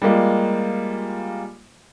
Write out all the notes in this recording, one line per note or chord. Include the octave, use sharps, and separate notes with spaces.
G3 G#3 A#3 F4